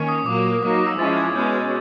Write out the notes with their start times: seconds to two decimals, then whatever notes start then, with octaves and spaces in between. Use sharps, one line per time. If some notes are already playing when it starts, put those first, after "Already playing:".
Already playing: D#3 A#3 C#4
0.08 D#6
0.26 A#2 F#3 A#3 D6
0.62 F#3 A#3 D#4 D6
0.75 D6
0.86 E6
0.98 F3 G#3 C#4 E4 A6
1.17 G#6
1.35 B2 G#3 C#4 G6
1.53 G#6